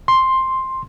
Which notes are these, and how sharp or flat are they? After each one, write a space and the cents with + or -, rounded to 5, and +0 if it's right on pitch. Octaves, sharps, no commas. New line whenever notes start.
C6 +5